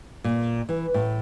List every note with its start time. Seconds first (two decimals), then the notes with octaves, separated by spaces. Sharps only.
0.24 A#2
0.69 E3
0.94 A2